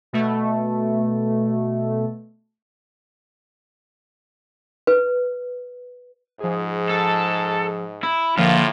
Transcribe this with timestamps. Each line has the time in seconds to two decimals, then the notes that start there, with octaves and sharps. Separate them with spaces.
0.13 B2 A3
4.87 B4
6.40 G#2 F3 G#4
6.89 A4
8.04 E4
8.37 A2 D3 F3 A#3 F4